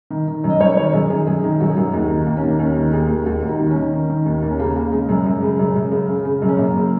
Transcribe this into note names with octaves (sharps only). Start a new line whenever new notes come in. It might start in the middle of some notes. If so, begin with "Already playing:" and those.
D#3
D#3
F#2
D#5
F#2 C#5
D#3 C#5
F#2 G#4
D#3 G#4
F#2 G#4
D#3
F#2 F#4
G#4
F#2 F#4
D#2 D#4
D#3
D#2 A#3
C#4
D#3 A#3
D#2 C#4
D#3
D#2 G#4
D#2
D#2 F#4
D#2
D#4
D#3
C#4
D#3
D#3
D#3
D#2
D#2
C#4
C#3 A#3
C#3 A#3
C#3 G#3
F#2 G#3
F#2
C#3
F#2
F#2
C#3
C#3
C#3
F#2
C#4
F#2 A#3
C#3